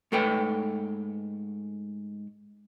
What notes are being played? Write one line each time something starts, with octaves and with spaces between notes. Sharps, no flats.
G#2 A3 A4 B4 G5